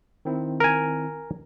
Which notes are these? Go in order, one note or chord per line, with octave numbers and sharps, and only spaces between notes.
D#3 C4 E4
A#4 G#5